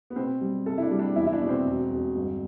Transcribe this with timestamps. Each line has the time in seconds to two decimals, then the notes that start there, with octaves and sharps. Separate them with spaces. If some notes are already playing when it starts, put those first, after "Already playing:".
0.10 B3
0.16 B2 C4
0.41 G3
0.66 C3 A4
0.78 E4
0.82 D4
0.91 G3
0.99 D4
1.16 E2 E4
1.27 E4
1.33 D4
1.41 B2
1.49 C4
1.66 E1
1.91 E1
2.16 G1